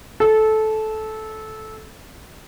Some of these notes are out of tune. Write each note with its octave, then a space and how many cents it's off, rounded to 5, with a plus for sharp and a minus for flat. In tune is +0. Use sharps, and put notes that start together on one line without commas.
A4 -15